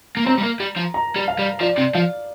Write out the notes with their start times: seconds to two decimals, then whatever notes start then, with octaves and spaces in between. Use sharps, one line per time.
0.17 A#3
0.26 C4 A#5
0.38 G3
0.43 A#3
0.60 G3
0.77 F3
0.94 A#5
1.16 G3
1.28 F5
1.39 G3
1.61 F3 D5
1.78 C3
1.95 F3 F5